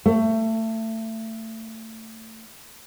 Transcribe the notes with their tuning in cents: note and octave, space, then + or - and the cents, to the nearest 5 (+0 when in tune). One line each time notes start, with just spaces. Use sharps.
A3 +25